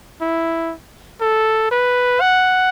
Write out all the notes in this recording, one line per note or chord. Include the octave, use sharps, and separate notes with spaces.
E4
A4
B4
F#5